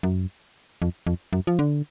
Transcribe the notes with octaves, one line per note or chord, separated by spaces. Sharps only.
F#2
F2
F2
F#2
F3
D3